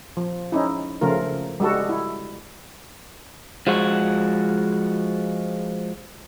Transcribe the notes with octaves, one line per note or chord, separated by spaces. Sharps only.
F3
C#4 D#4 E4
C#3 F3 A3 F4 A#4
G3 G#3 F#4 A4
E4
F3 G#3 F#4